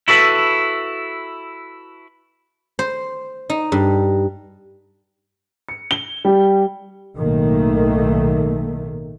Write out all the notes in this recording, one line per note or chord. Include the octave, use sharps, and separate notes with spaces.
E4 F#4 A4 B4
C5
D#4
G2
C#7
G7
G3
B1 A2 D#3 A3 A#3